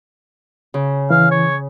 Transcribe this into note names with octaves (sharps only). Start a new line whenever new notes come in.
C#3
E3 F5
C#5